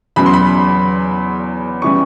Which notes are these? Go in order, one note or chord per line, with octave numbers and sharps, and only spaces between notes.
E2 C#3 F#3 B5
C6
B5
C#3 E3 G3 C#6